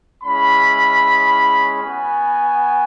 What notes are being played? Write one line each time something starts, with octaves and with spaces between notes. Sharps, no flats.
G#3 C#4 E4 B5
B3 F#4 G#5